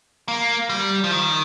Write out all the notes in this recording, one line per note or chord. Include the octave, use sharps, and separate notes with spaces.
A#3
G3
F3
D#3